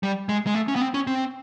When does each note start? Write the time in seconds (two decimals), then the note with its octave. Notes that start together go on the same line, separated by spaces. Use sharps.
0.03 G3
0.29 G#3
0.47 G#3
0.55 A3
0.68 C#4
0.76 B3
0.81 C4
0.94 C#4
1.07 C4